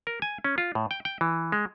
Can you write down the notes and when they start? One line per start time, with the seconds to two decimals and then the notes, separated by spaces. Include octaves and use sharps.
0.07 A#4
0.22 G#5
0.44 C#4
0.58 F4
0.75 A2
0.91 G5
1.05 G5
1.21 E3
1.52 G#3